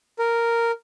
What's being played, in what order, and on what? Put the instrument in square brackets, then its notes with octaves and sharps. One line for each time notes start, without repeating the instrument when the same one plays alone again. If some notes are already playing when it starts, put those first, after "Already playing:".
[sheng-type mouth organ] A#4